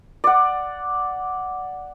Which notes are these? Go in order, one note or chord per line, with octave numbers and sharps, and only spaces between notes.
D5 F#5